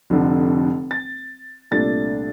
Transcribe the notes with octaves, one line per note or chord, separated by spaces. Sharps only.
F1 F2 D3
A6
C2 A#2 A3 D4 A6